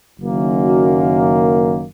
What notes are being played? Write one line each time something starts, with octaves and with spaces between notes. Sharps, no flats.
F#1 F#2 D#3 A#3
F#4